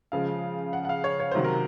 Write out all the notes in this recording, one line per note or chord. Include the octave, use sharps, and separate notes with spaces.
C#3 F3 G#3 F5
F#5
F#5
F5
C#5
C#5
C3 D#3 F#3 C5
A#4